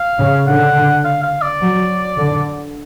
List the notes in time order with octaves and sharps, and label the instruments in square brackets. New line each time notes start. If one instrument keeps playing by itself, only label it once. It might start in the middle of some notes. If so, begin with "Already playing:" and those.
Already playing: [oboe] F5
[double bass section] C#3
[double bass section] D3 [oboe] F#5
[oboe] F5
F5
D5
[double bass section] F#3
D3